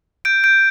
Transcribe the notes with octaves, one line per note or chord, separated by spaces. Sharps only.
G6 D7
G6 D7